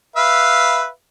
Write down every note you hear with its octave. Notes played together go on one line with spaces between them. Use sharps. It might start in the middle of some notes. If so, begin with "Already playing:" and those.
B4 E5 F5